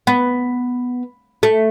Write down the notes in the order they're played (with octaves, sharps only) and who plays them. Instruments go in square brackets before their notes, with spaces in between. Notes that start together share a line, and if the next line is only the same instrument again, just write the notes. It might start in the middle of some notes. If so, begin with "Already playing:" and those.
[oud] B3
A3